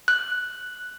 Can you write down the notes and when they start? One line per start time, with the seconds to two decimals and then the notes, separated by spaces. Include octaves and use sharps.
0.08 F#6